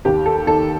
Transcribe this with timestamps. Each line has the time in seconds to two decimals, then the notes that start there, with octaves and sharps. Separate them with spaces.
0.05 D#2 G4
0.26 A4
0.47 D#3 A4